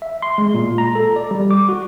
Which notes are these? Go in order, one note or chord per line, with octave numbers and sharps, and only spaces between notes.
E5
C6
G#3
A#2
A#5
A4
D5
G3
D6
F#4